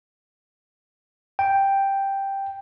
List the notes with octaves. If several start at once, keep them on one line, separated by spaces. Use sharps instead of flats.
G5